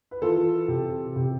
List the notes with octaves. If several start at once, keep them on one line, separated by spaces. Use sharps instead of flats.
B4
E3 F4 A4
C3
C3